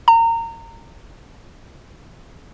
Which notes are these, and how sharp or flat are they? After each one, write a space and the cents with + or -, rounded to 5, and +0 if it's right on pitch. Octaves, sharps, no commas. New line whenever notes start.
A#5 -25